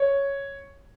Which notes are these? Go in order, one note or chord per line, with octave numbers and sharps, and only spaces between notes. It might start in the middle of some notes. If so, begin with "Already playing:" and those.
Already playing: C#5